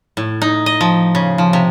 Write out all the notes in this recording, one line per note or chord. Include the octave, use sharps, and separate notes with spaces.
A2
D#4
D#5
F3
C#3
F3
C3